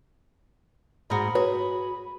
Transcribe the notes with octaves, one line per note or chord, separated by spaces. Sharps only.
G#2 F#4 A#4 D#5 B5
F#4 G#4 B4 C#5